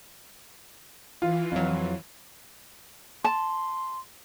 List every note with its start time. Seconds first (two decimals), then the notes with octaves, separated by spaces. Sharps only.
1.22 E3 F4
1.52 F2 F#3
3.24 A5 C6